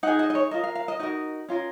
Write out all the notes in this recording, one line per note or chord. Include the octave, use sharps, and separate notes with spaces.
D#4 G#4 F#5
D#5
D#5
C#5
F4 A#4 D#5
F5
F5
D#5
D#4 F#4 A#4 D#5
C#4 F4 A#4